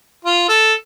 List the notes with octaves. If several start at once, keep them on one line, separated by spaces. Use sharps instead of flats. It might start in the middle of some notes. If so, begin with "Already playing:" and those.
F4
A4